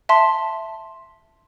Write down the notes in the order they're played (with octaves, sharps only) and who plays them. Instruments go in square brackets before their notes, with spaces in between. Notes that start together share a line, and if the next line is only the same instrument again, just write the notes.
[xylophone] E5 A5 C6